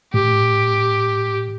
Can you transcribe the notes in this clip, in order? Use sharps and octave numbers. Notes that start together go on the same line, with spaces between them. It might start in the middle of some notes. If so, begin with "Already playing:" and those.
A2 G4